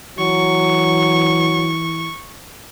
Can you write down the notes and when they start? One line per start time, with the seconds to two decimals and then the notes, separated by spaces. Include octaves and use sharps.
0.19 E3 F#3 C#6